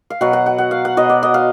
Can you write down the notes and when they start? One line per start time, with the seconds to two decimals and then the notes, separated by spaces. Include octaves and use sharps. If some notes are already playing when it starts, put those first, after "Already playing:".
0.10 F5
0.21 B2 F#3 F#5
0.33 F#5
0.46 F#5
0.58 F#5
0.71 F5
0.85 F#5
0.97 B2 F#3 D#5
1.09 D5
1.23 D#5
1.34 F5